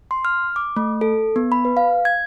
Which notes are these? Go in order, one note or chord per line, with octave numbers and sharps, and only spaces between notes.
C6
F6
D6
A3
A4
B3
B5
B4
F5
G#6